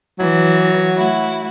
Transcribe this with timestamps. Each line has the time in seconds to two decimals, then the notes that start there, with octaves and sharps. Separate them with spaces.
0.19 E3 F#3
0.95 A3 E4 F#4